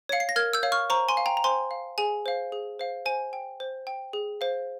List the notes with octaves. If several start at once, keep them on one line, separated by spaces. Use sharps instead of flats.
C#5 F5 C#7
C7
A#6
A#4 F6 G#6
E6 G6
C#5 F5
C#6 F6
C5 A#5 C#6
G#5 C6
F5
G5 A#5
A#5
C5 G#5 C6
F5
G#4 G#5
C5 F5
G#4
C5 F5
C5 G#5
G5
C5
G5
G#4
C5 F5